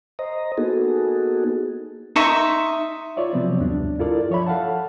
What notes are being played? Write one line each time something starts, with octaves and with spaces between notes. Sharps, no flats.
C5 D#5 A#5
A#3 B3 D#4 F#4 G#4 A4
D#4 E5 C6 C#6
F4 C#5 D5 E5
C3 F3 F#3 B3 C4
D2 G2 D4
E4 F4 A4 A#4 D5
F3 C#5 E5 B5
A4 F5 F#5 A5